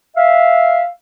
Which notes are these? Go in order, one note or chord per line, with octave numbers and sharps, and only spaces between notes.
E5 F5